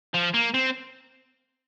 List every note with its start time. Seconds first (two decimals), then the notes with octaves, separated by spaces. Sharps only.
0.14 F3
0.34 A#3
0.54 C4